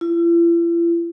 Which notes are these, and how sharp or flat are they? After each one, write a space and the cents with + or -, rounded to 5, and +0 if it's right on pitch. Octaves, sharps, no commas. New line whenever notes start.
E4 +45